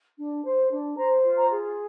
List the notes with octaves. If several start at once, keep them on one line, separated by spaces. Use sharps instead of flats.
D4
C5
D4
C5 A#5
F4
A#5
G#4